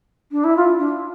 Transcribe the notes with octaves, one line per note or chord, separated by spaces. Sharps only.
D4
E4
F4
D4